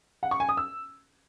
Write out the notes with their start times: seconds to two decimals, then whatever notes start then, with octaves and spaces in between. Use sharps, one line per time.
0.23 F#5
0.31 C#6
0.40 G#5
0.49 D#6
0.57 E6